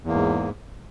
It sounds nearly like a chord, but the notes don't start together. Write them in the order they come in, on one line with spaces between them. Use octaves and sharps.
E2 A#3 G#2